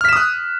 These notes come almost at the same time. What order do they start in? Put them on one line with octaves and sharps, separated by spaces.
F6 B6 E7 D#6 F#6